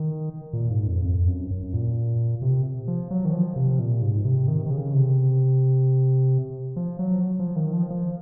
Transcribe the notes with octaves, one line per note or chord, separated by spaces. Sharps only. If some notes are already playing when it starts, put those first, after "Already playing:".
Already playing: D#3
A#2
G#2
F2
F2
F#2
F#2
A#2
C3
F3
F#3
D#3
F3
C3
A#2
G#2
C3
D#3
D#3
C#3
C3
F3
F#3
F3
D#3
F3
F3